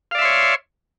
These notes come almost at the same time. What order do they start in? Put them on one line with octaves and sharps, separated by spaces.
F5 D5 E5 C6 C#5